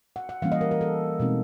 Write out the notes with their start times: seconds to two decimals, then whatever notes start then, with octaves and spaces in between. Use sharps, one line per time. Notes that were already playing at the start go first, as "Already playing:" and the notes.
0.16 F#5
0.29 F#5
0.42 E3 G3 A#3 C#4 F5
0.52 D#5
0.61 A#4
0.71 A#4
0.81 A4
1.20 B2 G#3 C4 D#4